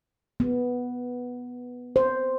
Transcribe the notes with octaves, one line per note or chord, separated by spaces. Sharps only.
B3
C5